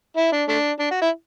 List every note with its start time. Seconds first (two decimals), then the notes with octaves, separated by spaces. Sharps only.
0.17 E4
0.32 D4
0.49 A3 D4
0.80 D4
0.91 F#4
1.01 E4